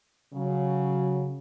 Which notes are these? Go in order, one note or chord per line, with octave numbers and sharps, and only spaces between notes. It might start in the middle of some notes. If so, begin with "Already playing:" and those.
C#3 F#3